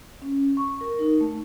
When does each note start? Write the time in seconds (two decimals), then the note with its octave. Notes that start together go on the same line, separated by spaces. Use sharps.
0.22 C#4
0.57 C#6
0.81 A#4
0.99 D#4
1.21 A3